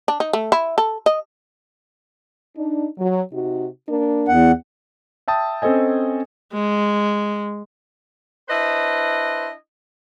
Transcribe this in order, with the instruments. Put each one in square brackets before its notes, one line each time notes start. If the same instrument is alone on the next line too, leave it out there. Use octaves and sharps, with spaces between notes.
[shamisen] D4
D#4
A3
E4
A4
D#5
[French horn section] D4 D#4
F#3
C3 D#4 F#4
A#3 D4 A#4
[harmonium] E2 F#5
[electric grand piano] E5 G5 A5 D#6
C4 C#4 A4 C5 D#5 G#5
[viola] G#3
[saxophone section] D4 E4 B4 C5 D#5